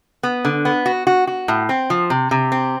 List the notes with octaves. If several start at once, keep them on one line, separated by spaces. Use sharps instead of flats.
B3
D3
B3
F#4
F#4
F#4
A2
C4
F3
C3
C3
C4